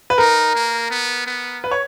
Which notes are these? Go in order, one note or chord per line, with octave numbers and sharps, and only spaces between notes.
B4
D#4 A#4
A#3
B3
B3
B4
C#5